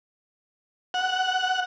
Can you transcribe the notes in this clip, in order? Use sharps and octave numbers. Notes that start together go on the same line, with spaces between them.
F#5